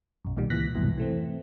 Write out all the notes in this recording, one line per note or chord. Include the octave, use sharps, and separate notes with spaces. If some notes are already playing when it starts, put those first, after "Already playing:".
B1 F#2
B1 A#2 D#3 G3
C#2 A#2 E3 F#6 A#6 B6
C2 F2 G#2 B2 E3
E3 A3 C4